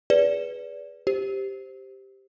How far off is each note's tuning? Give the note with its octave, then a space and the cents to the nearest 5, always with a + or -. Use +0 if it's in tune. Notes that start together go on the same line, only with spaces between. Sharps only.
G#4 +0 B4 +0 D5 -25
G4 +0 C5 +0